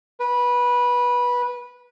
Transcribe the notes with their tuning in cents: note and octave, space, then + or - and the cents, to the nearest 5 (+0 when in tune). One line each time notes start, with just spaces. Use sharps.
B4 -15